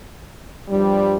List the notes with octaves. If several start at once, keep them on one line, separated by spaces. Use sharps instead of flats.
G2 F3 G3